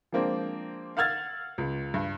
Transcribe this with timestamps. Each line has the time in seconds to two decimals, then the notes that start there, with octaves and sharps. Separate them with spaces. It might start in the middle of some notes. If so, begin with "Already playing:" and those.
0.12 F3 G#3 A#3 C4 D4
0.97 F5 F#5 E6 F6 G#6 A6
1.58 C#2
1.94 G2